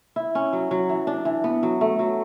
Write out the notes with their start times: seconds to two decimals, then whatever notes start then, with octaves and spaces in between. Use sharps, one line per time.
0.16 E4
0.35 C#4
0.53 F#3
0.71 F#3
0.89 E3
1.07 D4
1.25 E3
1.44 B3
1.63 F#3
1.81 A3
1.99 F#3